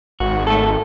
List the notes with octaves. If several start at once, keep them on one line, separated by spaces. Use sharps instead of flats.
G#1 F#4
A3 A4